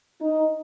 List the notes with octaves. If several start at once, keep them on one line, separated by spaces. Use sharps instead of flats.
D#4